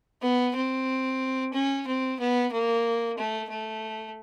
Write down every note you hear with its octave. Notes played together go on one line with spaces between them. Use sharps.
B3
C4
C#4
C4
B3
A#3
A3
A3